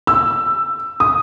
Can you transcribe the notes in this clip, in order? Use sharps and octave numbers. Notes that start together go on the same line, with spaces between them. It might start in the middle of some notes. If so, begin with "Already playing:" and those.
E6
D#6